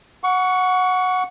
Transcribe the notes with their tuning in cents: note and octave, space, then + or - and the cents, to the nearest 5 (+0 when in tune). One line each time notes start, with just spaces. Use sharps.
F#5 -10 C#6 +20